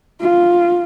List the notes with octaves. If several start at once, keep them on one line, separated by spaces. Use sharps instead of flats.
F4